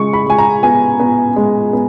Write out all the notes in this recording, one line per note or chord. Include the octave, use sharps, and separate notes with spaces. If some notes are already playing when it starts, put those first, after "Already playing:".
Already playing: C#3 G#3 C#6
B5
G#3 G#5
A#5
B3 G#5
B3
G#3
B3